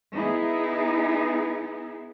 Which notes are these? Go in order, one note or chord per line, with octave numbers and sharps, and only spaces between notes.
B3 D#4 E4 G#4